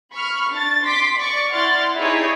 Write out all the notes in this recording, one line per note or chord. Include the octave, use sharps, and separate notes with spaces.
B5 C#6 F6
D4 A6
C6 D6 B6
D5 C#6 D6
E4 D5 F#5 C6 F6 A6
D#4 E4 G4 G#4 C#5 D5